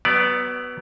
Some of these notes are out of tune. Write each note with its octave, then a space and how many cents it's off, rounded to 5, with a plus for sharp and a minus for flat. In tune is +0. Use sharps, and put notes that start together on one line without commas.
F#3 +30 B3 +0 D5 +0